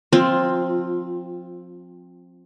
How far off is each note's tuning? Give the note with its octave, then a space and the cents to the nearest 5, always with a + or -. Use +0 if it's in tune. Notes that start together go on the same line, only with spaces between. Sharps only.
F3 +25 C4 +15 F4 +0